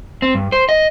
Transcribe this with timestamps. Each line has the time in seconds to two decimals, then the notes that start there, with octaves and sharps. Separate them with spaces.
0.22 C4
0.35 G2
0.52 C5
0.69 D#5